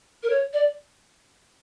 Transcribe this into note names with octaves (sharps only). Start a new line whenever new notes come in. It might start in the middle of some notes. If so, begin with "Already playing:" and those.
A#4
C#5
D5